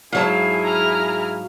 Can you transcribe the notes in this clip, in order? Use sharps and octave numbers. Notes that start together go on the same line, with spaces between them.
G#2 F#3 E4 G#4 F5 A5
A#5 F6